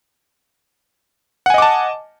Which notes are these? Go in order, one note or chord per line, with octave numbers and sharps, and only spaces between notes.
D#5 F#5 G#5 A5 D6